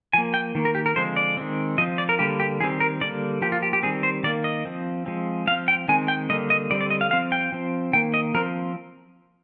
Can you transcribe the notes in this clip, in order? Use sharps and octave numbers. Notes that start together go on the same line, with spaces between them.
F3 A#3 G#5
G5
D#3 A#3
A#4
G4
A#4
D3 F3 G#3 C4 C5
D5
D#3 G#3 C4
F3 C4 D#5
D5
A#4
D3 G3 A#3 G4
G4
D#3 G3 C4 G#4
A#4
D3 G3 A#3 D5
F3 A#3 G4
F4
G4
G4
D#3 G3 C4 G#4
C5
D#3 A#3 D5
D#5
F3 C4
F3 G#3 C4
F3 C4 F5
G5
D#3 G#3 C4 G#5
G5
D3 G3 A#3 D#5
D#5
D3 G3 C4 D5
D5
D#5
F5
F3 C4 F5
G5
F3 C4
D#3 A#3 G5
D#5
F3 C4 A#4